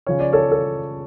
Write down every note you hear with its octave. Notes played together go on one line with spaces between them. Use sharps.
C#3 F3 C#4 C#5
D5
A4 C#5
A4